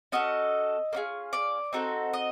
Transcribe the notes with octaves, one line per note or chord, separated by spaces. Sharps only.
C#4 F#4 A4 D#5
A#3 C#4 F4 G#4
D5
C4 D#4 F#4 A4
D#5